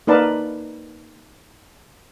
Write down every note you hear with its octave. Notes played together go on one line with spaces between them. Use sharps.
A#3 D#4 A#4 B4 D5 A5